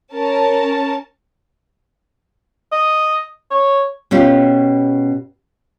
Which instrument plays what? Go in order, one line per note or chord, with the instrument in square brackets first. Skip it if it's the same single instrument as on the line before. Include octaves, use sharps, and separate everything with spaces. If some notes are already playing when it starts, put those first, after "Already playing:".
[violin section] C#4 A#4 A5
[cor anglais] D#5
C#5
[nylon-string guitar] B2 C#4 F4 G4